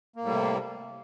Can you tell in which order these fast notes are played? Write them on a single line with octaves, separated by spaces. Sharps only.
A#3 A2 G3 C3